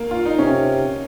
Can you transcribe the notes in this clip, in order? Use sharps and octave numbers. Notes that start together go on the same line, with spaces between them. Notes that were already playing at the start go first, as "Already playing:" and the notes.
Already playing: A#3
F4
D#4
C3 C#4